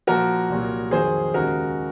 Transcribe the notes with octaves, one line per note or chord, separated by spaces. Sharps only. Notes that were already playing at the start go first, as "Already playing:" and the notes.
A#2 F3 A#3 F#4 A#4
C2 A#2 F#3
F2 D#3 F#3 G#4 C5
D#2 C#3 G#3 F#4 A#4